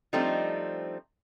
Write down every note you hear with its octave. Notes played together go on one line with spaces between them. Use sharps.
F3 G3 A3 C4 D4 D#4